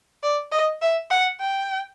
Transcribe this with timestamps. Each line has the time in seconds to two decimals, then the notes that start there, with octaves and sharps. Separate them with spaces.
0.23 D5
0.52 D#5
0.82 E5
1.11 F#5
1.40 G5